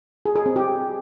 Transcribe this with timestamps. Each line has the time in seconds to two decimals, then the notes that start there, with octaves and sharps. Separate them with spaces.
0.25 G#4
0.36 G#4
0.46 C4
0.56 G4